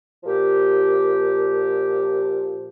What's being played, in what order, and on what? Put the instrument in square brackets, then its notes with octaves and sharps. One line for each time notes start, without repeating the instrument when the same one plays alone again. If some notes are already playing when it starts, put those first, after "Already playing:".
[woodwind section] A#2 F3 G4